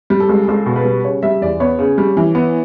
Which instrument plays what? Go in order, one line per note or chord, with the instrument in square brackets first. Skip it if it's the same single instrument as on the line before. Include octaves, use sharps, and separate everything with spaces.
[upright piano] G3
A4
C#2
C#2 A4
B2
B4
G3
C#3 C#5
G3 E5
E2 D5
B3 C#5
C#3
G3
E3
B3